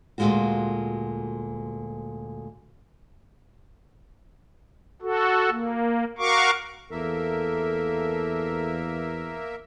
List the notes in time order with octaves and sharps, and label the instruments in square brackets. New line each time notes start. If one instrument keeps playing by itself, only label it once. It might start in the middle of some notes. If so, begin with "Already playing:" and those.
[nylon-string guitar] D2 A#2 F#3 G#3 F4 F#4
[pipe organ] F#4 A4
A#3
F#4 A#4 F5 C#6 D6
[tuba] E2 [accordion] A#3 A#4 E5 [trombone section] A4